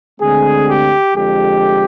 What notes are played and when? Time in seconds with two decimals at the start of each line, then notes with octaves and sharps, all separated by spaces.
0.19 D2 D3 G#3 C4 G#4
0.66 G4
1.14 F2 D3 G#3 G4